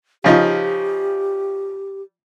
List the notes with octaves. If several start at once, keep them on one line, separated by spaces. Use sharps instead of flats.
C#3 F3 D#4 G4